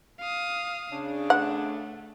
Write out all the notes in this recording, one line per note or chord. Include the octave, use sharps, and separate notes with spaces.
F5 D#6
C#3 D4
A3 F#5